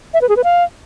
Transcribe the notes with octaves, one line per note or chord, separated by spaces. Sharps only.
E5
B4
G#4
B4
F5